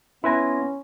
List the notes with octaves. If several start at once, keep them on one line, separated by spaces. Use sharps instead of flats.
B3 C#4 E4 B4 G#5 C6 A#6